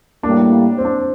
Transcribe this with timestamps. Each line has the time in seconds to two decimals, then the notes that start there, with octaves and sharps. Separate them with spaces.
0.23 A2 G3 A#3 D4
0.78 C4
0.85 D4